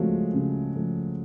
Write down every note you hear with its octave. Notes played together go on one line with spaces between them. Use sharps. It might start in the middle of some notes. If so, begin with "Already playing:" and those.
Already playing: C#3 F3 F#3 G#3 A3
C#3
F3 A3